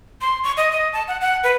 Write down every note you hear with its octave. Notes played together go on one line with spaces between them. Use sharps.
C6
C#6
D#5
D#5
A5
F#5
F#5
B4